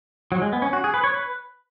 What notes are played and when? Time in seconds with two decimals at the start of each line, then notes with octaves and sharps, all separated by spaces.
0.32 F#3
0.42 G#3
0.53 B3
0.62 C#4
0.73 F#4
0.84 G#4
0.94 B4
1.04 C#5
1.14 B4